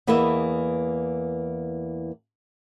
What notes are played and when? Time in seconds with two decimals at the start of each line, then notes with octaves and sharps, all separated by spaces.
0.07 E2 E3 A#3 B4 D#5 E5